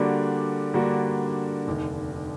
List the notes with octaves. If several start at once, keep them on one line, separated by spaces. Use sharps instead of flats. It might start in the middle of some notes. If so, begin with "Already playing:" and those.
Already playing: D3 G3 A#3 D4 F#4
D3 G3 A#3 D4 F#4
F1 D#2 D3